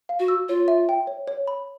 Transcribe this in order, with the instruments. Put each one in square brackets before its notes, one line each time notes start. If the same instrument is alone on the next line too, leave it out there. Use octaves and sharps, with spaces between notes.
[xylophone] F5
[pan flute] F#4
[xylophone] E6
[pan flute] F4 [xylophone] C#5
[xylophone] E5
G5
C#5
C#5
B5